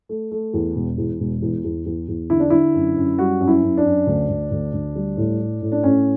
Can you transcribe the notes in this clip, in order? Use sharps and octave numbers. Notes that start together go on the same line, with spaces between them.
A3
A3
E2
E1
E2
E1
E2
E2
E2
E2
D3 E4
D4
D3 E4
F#2
F#2
G3 F#4
F#2
E4
F#2
D4
F#2
D2
D2
D2
D2
G3
A2
A2
A2
D4
A2 C#4